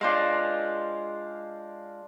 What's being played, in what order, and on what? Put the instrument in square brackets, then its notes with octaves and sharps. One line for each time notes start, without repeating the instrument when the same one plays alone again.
[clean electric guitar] G#3 F4 [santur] D4 C5 F5